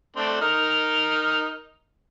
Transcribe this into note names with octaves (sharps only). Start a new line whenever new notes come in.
A3 C4 D4
D#4 A#4 F6